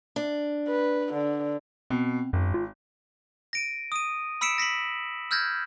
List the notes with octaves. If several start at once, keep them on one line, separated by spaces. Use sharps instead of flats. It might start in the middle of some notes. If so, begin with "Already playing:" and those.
D4
B4
D3
B2 C4
G#1 F#2
F4
A#6 D7 D#7
D#6 D#7
B5 E6 B6 C#7 D7 E7
A#6 B6 C#7 F#7
E6 F6 G6 G#6 A#6